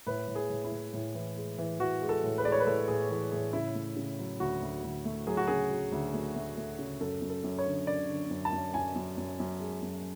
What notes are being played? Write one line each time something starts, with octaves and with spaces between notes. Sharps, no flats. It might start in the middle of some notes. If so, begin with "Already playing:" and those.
A2 B4
A2
G#4
A2
E4
A2
A2
E3
G#3
E3
E3 F#4
G#3
A4
A2
B4
G#3 D5
C#5
B4
A2 A4
A2 G#4
E3 G#4
A2 G#4
C#3 E4
A3
C#3
F#3
D2 F#4
D2
D2
A3
F#3 G#4
F#4
C#3 G#4
F#3
D2
A3
A3
A3
C#3
F#2 A4
F#2
A4
F#2
C#5
D3
D3 D5
D3
F#2
A5
F#2
F#2 G#5
F#2
F#2
F#2
G#3
F#2